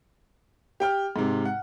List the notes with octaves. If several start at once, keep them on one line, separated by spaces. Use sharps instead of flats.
G4 G5 F6
G#2 C3
F#5